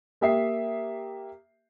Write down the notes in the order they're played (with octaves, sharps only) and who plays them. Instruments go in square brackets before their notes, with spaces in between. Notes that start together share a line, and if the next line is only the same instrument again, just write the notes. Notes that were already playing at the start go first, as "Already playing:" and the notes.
[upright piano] A#3 G4 E5 D#6 C7